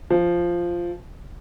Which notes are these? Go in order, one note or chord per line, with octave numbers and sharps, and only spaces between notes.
F3